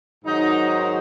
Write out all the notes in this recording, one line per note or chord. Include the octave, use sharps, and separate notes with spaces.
G#2 D#3 F#3 D#4